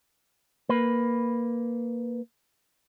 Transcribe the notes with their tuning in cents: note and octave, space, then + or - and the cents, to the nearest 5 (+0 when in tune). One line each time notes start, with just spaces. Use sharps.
A#3 +0 B4 +0